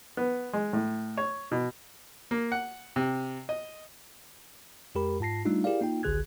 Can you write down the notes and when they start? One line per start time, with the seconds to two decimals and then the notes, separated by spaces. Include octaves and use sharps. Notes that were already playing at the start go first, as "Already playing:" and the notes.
0.17 B3
0.53 G#3
0.73 A2
1.17 C#5
1.51 B2
2.31 A#3
2.52 F#5
2.96 C3
3.49 D#5
4.95 F2 G#3 G4 A#4 B5
5.20 G#2 F4 A5 A#6 C7
5.45 G3 A3 D4 D#4 F4
5.64 E4 G4 G#4 A#4 D5 F5
5.81 A#3 D#4 F4 G5
6.03 G#1 C#2 D3 G#4 F#6 G#6